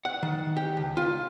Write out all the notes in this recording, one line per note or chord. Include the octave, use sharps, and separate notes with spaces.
F#5
D#3
G4
C#2
F4